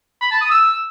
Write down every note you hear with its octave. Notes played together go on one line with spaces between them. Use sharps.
B5
A5
D#6
E6